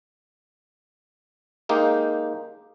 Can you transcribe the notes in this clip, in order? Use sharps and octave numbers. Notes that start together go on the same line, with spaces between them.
G#3 A#3 D#4 G4